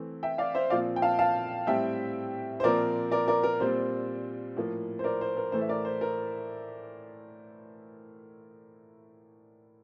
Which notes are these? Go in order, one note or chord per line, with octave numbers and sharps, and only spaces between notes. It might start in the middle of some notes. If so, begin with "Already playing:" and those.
Already playing: E3 A3 C4
E5 G5
D5 F5
C5 E5
A#2 F3 C4 D5 F5
G5
F5 A5
F5 A5
A2 G3 C4 E5 G5
C5
A#2 F3 C4 A#4 D5
A#4 D5
A#4 D5
A#4
A#2 G3 C4 C5
A2 F3 A#3
C5
A#4 D5
C5
A#4
A2 E3 A3 C5
E5
A#4 D5
C5
A#4